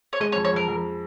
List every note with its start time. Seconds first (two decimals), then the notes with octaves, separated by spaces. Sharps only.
0.13 C#5
0.20 G#3 D#5
0.32 C#5
0.36 F2
0.45 C#5
0.53 F2 A#4
0.68 F2